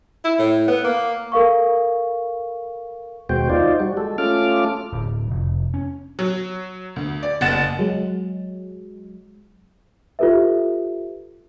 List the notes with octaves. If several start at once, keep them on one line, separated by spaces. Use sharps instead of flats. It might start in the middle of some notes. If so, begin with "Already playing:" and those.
E4
A2
B3
A#3
A4 A#4 F5 C#6
D#2 B2 G#3 F#4 C5 G5
D#4 F4 C5 D5
G3 F#4
G#3 A4
A3 C#4 F4 A4 D6 F6
D1
F1
C#4
F#3
D2
D5
F#1 F#5 A6 E7
F#3 G#3
F4 G4 A4 B4 E5